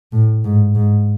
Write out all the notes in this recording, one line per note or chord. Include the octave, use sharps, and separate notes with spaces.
A2
G#2
G#2